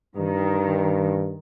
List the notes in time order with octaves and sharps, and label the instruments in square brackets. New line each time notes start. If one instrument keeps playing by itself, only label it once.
[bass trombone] G2 [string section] D#3